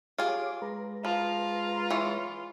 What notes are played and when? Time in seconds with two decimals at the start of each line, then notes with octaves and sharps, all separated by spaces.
0.18 F4 G4 G#4 C#5 D6
0.62 G#3 B4 A#5
1.05 F3 F4
1.90 E3 C#5